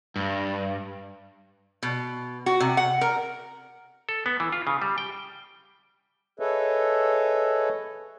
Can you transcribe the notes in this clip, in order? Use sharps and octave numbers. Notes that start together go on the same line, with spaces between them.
G2
B2
F#4
C3
F#5
A#4
A4
B3
E3
F4
C#3
G3
G5
G#4 A4 B4 C#5 D#5 E5